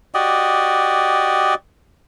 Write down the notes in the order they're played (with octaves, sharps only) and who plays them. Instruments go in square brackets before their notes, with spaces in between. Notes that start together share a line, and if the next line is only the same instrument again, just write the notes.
[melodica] F#4 G4 D5 D#5